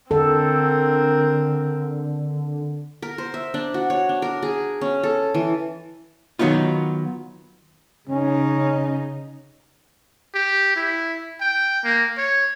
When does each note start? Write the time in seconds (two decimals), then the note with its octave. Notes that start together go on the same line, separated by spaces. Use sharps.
0.11 D3 C4 A4 A#4
3.02 A#4
3.18 C5
3.34 E5
3.54 D4
3.74 F#4
3.90 C#5
4.09 D4
4.22 A#4
4.43 G#4
4.81 C#4
5.03 A4
5.34 E3
6.39 D#3 F#3 B3 D#4 F4
8.09 C#3 C#4 D#4
10.34 G4
10.76 E4
11.41 G5
11.84 A#3
12.18 C#5